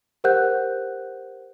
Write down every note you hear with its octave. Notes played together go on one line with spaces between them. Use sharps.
G4 A#4 C5 F#5 F#6 G6